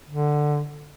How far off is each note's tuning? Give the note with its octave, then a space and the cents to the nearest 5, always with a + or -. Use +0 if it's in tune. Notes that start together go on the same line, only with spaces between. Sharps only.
D3 +10